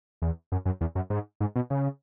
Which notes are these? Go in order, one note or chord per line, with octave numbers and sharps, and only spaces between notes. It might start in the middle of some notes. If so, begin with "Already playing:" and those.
E2
F#2
F#2
E2
F#2
G#2
G#2
B2
C#3